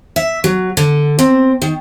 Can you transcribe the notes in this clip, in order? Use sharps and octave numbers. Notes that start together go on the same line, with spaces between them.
E5
F#3
D3
C4
D#3